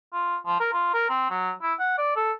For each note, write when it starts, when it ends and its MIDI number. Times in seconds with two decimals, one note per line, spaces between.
0.13 0.36 65
0.46 0.58 53
0.60 0.70 70
0.73 0.90 65
0.93 1.08 70
1.09 1.26 60
1.30 1.52 54
1.62 1.74 64
1.79 1.93 78
1.98 2.14 74
2.16 2.32 69